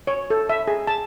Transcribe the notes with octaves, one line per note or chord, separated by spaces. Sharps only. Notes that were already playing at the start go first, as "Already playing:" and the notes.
C#5
A4
E5
G#4
A5